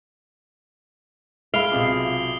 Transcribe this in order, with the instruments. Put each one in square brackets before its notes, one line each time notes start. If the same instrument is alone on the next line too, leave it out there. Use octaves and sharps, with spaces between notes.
[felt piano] G#3 E5 B5 [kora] F5 [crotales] D7 F7 G7
[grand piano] B1 C3 F4 [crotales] D6 D#6 C7